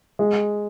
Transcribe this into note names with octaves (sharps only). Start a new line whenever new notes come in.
G#3